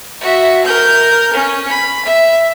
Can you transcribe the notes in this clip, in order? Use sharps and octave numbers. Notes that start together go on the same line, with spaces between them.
F#4 E5
A#4 G6
C#4
B5
E5